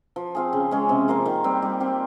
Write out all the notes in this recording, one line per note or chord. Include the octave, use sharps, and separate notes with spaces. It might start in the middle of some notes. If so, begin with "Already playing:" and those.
F3
C4 F4 G#4
C#3
G#3 C#4
C3
F3 A#3 F4
D#3
G3 C4
G3
C4 G4